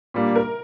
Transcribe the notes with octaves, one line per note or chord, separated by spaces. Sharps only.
A#2 G3 A#3 D4
A#4